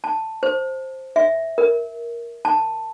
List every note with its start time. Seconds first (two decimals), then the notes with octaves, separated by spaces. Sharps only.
0.04 A5
0.43 C5
1.16 E5
1.58 A#4
2.45 A5